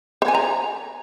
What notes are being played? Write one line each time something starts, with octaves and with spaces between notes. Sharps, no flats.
C5
G#5
A#5